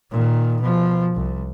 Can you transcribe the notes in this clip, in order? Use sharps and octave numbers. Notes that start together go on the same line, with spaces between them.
A#2 D#3
B2 F3
C2